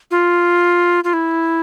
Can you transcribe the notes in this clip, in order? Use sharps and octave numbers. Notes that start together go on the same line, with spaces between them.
F4
F4
E4